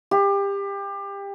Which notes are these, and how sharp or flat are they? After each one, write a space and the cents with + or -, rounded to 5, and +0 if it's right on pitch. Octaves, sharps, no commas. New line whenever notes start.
G4 +25